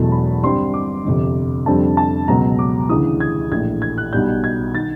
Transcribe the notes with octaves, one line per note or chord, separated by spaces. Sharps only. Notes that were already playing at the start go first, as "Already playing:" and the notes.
Already playing: E1 E2 B2 F#3 A3 A5
B5
G2 D3 G3 C4 C6
D6
G1 F2 C3
F2 D3 G3 C4 A5
A5
C#2 B2 F#3 B3 A#5
D6
D2 C#3 E3 D#6
G#6
A#1 A2 E3 G#6
G#6
F#6
B1 B2 G3 G6
G#6
D#3 A6